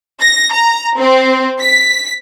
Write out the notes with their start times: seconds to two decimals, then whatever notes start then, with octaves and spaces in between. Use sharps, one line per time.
0.21 A#6
0.52 A#5
0.99 C4
1.60 B6